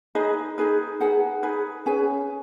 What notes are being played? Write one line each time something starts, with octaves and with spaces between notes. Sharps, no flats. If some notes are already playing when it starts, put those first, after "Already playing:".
D#4 G#4 B4 D#5
D#4 G#4 B4
D#4 G#4 B4 F#5
D#4 G#4 B4
C#4 G#4 B4 G#5